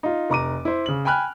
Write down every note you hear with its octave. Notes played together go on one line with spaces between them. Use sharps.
D#4 F4
F1 A#5 D6 D#7
E4 C5
C#3 F#7
G5 G#5 B5 F6 F#6